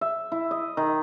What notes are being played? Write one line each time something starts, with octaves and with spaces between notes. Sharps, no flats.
E5
E4
D#5
D#3